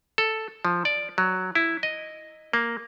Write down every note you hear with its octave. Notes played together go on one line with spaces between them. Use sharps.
A4
F3
D5
F#3
E4
D#5
A#3